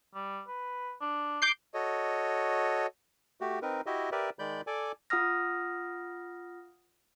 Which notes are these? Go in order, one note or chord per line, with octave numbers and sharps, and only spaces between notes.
G3
B4
D4
D6 G6 C7
F#4 A4 C#5 D#5
A3 F#4 G4
C4 D#4 A#4 B4
E4 F#4 G4 D#5 E5
G4 A#4 B4 D5 E5
D#3 G#3 D5 B5 G6
A4 D5 G#5 D6
F4 F#5 D#6 F6 A#6